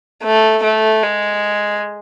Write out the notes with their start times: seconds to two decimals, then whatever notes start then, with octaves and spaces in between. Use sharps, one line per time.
0.23 A3
0.63 A3
1.03 G#3